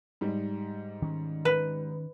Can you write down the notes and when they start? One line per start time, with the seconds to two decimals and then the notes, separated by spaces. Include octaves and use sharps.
0.21 G#2 G3
1.02 D#3 C#4
1.45 B4